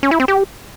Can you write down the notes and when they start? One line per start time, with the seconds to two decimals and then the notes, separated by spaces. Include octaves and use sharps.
0.03 C#4
0.11 E4
0.20 C4
0.28 G4